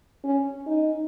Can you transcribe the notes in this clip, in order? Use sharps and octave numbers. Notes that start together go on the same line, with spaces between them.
C#4
D#4